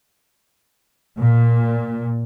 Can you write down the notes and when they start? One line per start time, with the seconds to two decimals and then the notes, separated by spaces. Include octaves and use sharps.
1.19 A#2